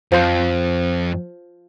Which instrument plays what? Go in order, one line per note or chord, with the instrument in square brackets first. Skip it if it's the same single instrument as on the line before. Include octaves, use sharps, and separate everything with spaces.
[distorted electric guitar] F2 [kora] F3 C5